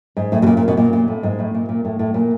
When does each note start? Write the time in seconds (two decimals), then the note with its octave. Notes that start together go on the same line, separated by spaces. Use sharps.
0.17 G#2
0.32 A2
0.42 B2
0.47 A#2
0.57 A#2
0.68 B2
0.77 A#2
0.93 A#2
1.08 A2
1.23 G#2
1.39 A2
1.54 A#2
1.69 A#2
1.85 A2
1.99 A2
2.14 A#2